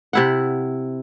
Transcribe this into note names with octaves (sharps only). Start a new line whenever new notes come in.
C3 E4 F#5